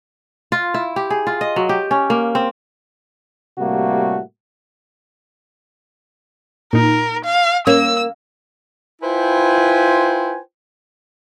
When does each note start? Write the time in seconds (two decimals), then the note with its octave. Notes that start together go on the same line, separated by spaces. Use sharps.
0.52 F4
0.74 E4
0.96 G4
1.10 G#4
1.27 F4
1.41 D#5
1.56 F#3
1.69 G4
1.91 C#4
2.10 A#3
2.35 C4
3.58 A2 C3 G3 A3 A#3 F#4
6.73 A#2 D#4 A#4
7.24 F5
7.67 A#3 C#4 E6
9.02 E4 F4 B4 C5 G5 G#5